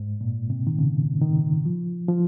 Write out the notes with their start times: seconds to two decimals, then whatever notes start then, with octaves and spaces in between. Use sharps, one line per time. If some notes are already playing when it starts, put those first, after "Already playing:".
Already playing: G#2
0.21 A#2
0.50 C3
0.67 D#3
0.79 C#3
1.22 D#3
1.65 F3
2.08 F3